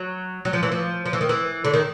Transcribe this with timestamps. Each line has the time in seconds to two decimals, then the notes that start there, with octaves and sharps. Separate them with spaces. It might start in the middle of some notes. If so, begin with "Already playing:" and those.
Already playing: F#3
0.45 F#3
0.53 F3
0.63 E3
0.72 F3
1.06 F3
1.13 E3
1.21 D#3
1.29 E3
1.65 D3
1.74 D#3